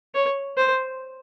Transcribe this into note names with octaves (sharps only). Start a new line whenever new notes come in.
C#5
C5